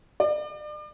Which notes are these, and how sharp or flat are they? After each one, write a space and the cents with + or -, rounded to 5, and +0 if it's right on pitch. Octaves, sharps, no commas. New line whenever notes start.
D5 +40